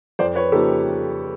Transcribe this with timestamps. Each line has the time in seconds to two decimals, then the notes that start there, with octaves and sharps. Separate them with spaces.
0.19 F2 C5 D5
0.35 B4 C#5
0.52 C#3 F3 A#3 D#4 G4 A4